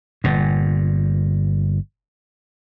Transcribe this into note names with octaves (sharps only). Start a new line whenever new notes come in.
G1 A#2